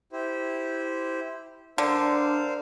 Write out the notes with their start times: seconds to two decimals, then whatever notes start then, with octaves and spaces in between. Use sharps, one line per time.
0.12 E4 G4 C5
1.78 D3 D4 A#4 C5 F5